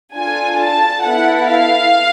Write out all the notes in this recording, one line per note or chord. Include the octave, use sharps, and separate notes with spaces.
D4 F4 A4 G#5
A5
B3 E4 A4 F#5
F5